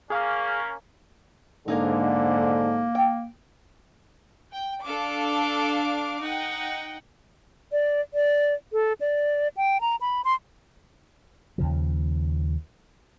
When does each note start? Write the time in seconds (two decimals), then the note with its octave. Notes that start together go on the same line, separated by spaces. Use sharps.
0.10 A#3 C#4 G#4 F5
1.68 G#2 D3 A#3 D#4 G#4 A#4
2.95 G5
4.52 G5
4.83 D4 A4 F5 D6
6.21 D#4 F#5 G5
7.72 D5
8.14 D5
8.73 A4
9.01 D5
9.57 G5
9.81 A#5
10.01 B5
10.25 C6
11.58 D#2 C#3 F3